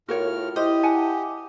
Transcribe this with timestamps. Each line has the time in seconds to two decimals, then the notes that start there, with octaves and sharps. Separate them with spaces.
0.08 A2 F4 F#4 A#4 C#5 F6
0.56 E4 G4 C5 D#5
0.83 F#5 G#5 A5